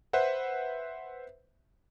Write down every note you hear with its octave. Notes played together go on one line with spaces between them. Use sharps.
B4 C5 E5 F#5